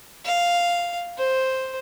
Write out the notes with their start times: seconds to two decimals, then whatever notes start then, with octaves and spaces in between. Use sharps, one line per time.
0.25 F5
1.18 C5